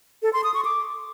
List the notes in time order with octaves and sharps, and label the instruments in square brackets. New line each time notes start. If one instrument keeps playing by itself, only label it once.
[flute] A4
C6
D#6
C#6
D6